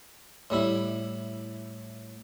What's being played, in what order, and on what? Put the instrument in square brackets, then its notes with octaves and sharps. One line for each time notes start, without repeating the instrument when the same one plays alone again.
[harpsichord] A2 G3 E4